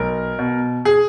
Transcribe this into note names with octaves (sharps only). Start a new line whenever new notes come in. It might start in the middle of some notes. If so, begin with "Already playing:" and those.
Already playing: B1 A#4
B2
G#4